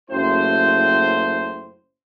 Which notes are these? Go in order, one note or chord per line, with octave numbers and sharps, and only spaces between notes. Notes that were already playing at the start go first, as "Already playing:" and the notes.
F#1 F#2 A2 C5